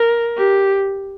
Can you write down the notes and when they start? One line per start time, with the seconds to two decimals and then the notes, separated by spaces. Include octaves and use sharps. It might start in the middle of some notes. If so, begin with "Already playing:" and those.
Already playing: A#4
0.37 G4